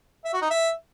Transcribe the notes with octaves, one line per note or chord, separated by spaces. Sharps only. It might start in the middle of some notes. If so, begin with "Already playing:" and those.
E5
F#4
D#4
E5